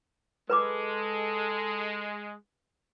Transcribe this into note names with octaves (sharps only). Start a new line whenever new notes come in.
G#3 A4 B4 B5 D6